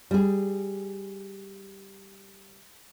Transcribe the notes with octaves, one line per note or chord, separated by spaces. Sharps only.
G3 G#4